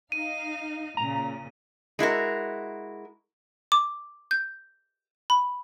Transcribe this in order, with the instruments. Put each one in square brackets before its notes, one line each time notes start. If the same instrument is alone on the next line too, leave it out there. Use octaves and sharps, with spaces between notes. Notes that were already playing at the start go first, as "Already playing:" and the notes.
[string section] D#4 F5 [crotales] D#7
[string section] A#2 C#3 [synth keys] A#5
[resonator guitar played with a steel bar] G#3 E4 F#4 A#4
[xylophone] D6
G6
B5